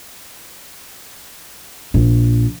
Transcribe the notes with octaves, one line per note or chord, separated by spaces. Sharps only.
A#1